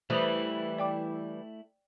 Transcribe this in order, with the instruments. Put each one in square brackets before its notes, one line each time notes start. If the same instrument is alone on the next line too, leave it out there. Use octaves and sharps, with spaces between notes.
[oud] E3 G3 [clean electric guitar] A3 E4 [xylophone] C5 D#6 F7
[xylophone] D5 G5 D6